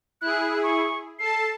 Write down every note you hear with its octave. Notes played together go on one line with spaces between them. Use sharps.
E4 G#4 F#6
C#6
A4 A5 C7